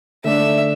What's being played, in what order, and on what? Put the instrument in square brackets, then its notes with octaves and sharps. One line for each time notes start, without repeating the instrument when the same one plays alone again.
[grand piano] D3 A3 D4 [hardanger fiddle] E5